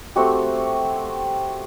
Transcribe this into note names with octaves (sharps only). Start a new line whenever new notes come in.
A3 C4 F#4 G4